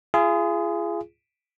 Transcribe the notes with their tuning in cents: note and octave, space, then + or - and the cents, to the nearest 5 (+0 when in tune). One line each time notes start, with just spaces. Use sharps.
F4 -40 G#4 +0